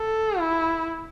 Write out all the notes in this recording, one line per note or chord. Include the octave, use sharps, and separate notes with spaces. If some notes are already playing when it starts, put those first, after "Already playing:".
Already playing: A4
E4